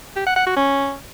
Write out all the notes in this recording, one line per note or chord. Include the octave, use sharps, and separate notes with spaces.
G4
F#5
F#5
F#4
C#4